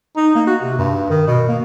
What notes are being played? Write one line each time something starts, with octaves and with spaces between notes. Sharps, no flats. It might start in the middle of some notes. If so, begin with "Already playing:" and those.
D#4
A#3
F#4
C3
G2
D#3
B2
A#3